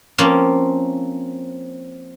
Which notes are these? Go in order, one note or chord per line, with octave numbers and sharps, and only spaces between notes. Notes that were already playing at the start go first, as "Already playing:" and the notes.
F3 A#3 C4 C#4